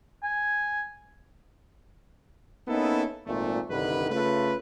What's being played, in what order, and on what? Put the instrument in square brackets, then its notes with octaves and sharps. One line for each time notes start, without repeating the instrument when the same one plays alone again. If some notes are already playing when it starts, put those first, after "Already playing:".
[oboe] G#5
[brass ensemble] A#3 B3 C#4 D#4 E4 A4
G#1 A#2 A3
C2 G2 D3 D#3 B4
C#3 A3 F4 B4